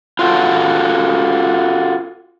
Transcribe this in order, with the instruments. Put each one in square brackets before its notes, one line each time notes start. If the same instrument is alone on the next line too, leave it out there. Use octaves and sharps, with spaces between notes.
[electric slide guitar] F4 F#4 A4